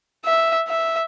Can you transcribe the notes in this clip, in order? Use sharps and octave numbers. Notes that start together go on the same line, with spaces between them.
E5
E5